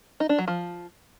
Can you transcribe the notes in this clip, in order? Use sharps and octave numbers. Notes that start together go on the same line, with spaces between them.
D#4
D4
F#3
F3